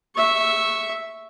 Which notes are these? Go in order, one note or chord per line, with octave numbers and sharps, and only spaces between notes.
E5 C#6